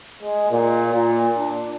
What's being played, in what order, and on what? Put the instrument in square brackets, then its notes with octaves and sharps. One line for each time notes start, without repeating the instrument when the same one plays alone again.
[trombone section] G#3
A#2
A#2
D4